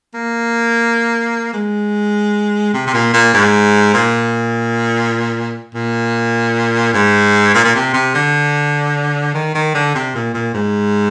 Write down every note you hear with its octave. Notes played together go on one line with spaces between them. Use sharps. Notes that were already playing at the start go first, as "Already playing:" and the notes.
A#3
G#3
C3
C3
A#2
A#2
G#2
A#2
A#2
G#2
A#2
A#2
C3
C3
D3
D#3
D#3
D3
C3
A#2
A#2
G#2